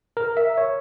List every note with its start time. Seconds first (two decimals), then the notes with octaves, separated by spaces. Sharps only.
0.17 A#4
0.37 E5
0.57 C#5